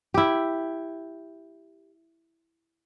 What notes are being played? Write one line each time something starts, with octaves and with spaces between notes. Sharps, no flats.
E4 G4